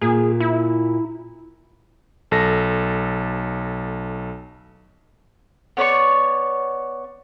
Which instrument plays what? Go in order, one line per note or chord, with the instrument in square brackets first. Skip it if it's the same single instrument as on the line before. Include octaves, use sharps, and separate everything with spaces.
[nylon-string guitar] A#2 [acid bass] G#4
[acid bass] E4
[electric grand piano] B1 A4 A#6
[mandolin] B3 C#5 D5 C#6